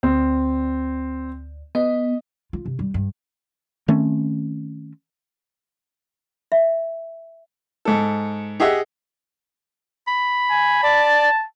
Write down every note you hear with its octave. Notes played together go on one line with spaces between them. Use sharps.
D2 C4
B3 D#5
F4
C3
G3
G2
D#3 A3 C4 C#4
E5
G#2 A4
G4 G#4 D#5 E5 F#5
B5
G#5
D5 A5